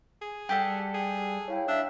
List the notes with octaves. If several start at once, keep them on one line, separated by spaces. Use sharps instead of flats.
G#4
G3 G4 A4 F#5 G5 B6
G#4 G5
E4 C#5 F5 G5
D4 E5 E6